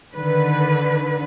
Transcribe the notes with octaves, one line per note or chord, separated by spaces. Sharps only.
D3 D#3 B4